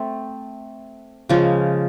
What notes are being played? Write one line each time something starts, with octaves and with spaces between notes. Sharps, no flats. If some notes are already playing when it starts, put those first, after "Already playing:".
Already playing: A3 C4
C#3 F3 G#3